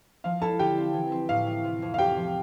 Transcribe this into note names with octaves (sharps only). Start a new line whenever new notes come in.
F3 F5
E4 A4 A5
D3 G4 G5
C4
E3
C4
A2 F5
A3
C3
F2
F5
F2 G4 G5
F3